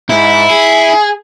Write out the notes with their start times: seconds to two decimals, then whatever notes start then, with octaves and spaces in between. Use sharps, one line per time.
0.10 G#2 E4
0.50 G#4